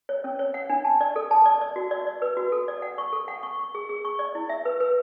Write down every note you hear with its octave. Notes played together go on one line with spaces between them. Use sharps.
C#5
C#4
C#5
F#5
D4
A5
D5
A4
A5
D5
D5
F#4
D5
D5
B4
F#4
A4
D5
F#5
C#6
A4
F#5
C#6
C#6
G#4
G#4
C#6
D5
E4
E5
B4
B4